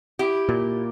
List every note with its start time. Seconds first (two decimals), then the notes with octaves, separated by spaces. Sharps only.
0.19 E4 G4
0.49 A#2